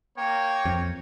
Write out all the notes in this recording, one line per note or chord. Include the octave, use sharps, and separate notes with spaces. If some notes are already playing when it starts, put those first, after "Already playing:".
A#3 C#5 G5
F2